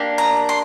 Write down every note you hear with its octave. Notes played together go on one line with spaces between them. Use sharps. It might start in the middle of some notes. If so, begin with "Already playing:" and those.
Already playing: A#3 D4 G4
A#5
C6